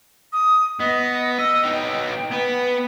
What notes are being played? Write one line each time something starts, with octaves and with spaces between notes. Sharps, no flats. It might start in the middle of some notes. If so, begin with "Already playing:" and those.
D#6
B3 D#5
D#5 E6
B3 D#4 G5
B3 B4